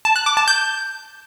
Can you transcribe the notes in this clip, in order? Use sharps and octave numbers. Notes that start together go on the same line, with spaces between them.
A5
F#6
D6
A5
G6